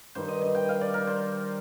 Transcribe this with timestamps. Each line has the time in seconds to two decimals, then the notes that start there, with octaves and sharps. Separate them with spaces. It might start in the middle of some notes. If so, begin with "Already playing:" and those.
0.15 G2 D#3 C5
0.28 D#5
0.42 D#5
0.55 G5
0.69 F5
0.81 D5
0.94 A#4
1.07 C5